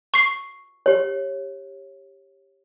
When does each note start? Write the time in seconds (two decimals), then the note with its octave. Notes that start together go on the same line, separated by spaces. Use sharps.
0.14 C#6 C7
0.86 G4 C#5